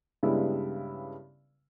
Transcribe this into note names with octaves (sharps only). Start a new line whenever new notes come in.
G2 C#3 G3 G#3 B3 E4